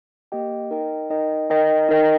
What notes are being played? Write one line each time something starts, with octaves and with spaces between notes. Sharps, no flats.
A#3 G4 D#5 G5
D#4 A#4 D#5 G5
D#4 A#4 D#5 G5
D#4 A#4 D#5 G5
D#4 A#4 D#5 G5